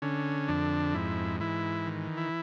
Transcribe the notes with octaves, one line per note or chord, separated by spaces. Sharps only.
D3 C#4
F2 D4
G#2 E4
E3 E4
D#3
E4